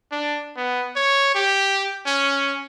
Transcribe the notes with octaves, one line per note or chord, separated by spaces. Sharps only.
D4
B3
C#5
G4
C#4